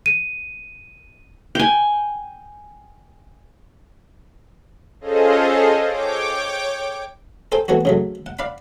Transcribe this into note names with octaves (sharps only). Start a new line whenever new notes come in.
D#7
G5 G#5
C#4 F4 G#4 A4 C5 D#5
C#5 G5 D6
A4 C5 G5 G#5
E3 A3 B3 F#4
C#3 F#3 A3
F#5
D5 F5 F#5 B5